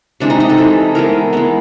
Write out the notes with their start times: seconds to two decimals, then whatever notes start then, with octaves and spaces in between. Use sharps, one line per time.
0.20 C3 E3 G#3 D4
0.30 D#4
0.40 D#4
0.49 A4
0.58 C3 E3 G#3
0.95 E3 G#3 B3 A#4
1.33 E3 G#3 B3